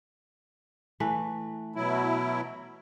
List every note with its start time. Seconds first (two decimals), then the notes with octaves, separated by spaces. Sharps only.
1.00 E3 A3 B4
1.76 B2 F#3 E4